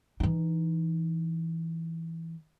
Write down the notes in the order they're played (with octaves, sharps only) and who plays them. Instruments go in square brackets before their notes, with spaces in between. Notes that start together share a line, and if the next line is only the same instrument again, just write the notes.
[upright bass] E3 D#4